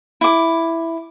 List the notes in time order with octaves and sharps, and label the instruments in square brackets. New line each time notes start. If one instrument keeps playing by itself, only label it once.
[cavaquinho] E4 D6